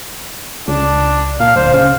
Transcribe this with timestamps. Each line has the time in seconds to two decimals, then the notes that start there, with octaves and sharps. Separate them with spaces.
0.68 C#2 D4
1.40 A#2 F5
1.56 D1 C5
1.74 C#3 F5